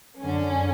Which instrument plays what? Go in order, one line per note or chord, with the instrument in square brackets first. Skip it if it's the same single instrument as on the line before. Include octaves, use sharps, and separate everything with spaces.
[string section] F#2 D3 C#4